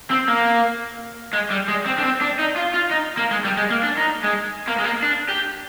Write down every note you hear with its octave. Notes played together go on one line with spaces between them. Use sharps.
C4
A#3
G#3
G3
G#3
C4
D4
C4
D4
D#4
F4
F4
D#4
A#3
G#3
G3
G#3
A#3
D4
D#4
G#3
A#3
G#3
A#3
D4
G4